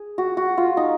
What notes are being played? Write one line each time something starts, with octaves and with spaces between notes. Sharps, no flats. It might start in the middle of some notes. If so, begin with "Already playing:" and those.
Already playing: G#4
F#4
F#4
F4
D#4